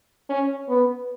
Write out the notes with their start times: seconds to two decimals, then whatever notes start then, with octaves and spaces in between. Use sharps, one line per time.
0.29 C#4
0.69 B3